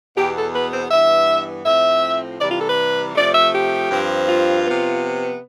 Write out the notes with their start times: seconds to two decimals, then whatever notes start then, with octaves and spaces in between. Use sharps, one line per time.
0.16 E2 B2 B3 G4
0.35 A4
0.53 B4
0.72 C5
0.90 G2 E3 B3 E5
1.65 A2 F3 C4 E5
2.40 C3 E3 G3 D5
2.50 F4
2.59 A4
2.68 B4
3.15 C3 F3 A3 D5
3.34 E5
3.53 G4
3.90 G2 F3 C4
4.27 F4
4.64 C3 F3 B3